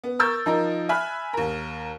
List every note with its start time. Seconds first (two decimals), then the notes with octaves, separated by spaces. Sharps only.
0.04 B3
0.19 A#4 C#6 E6 G6 A6
0.46 F3 D#4 A#4
0.89 E5 G#5 B5 F6 F#6
1.33 D#2 A#4